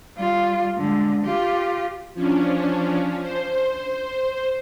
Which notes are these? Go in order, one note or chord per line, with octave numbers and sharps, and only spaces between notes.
G3 F4
D3 G#3
F4 G4
F3 C#4 D4
C5